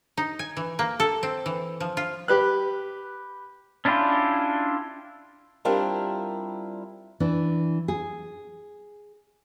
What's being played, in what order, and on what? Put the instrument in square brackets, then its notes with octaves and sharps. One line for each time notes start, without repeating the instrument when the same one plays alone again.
[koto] D#4
G#5
E3
A#3
A4
C4
E3
F3
F4
[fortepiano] G4 B4 F#6
[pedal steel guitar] C#4 D4 E4 F4 G4
[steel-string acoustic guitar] G3 C4 D4 E4 F4 A#4
[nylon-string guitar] E3 D4
G#4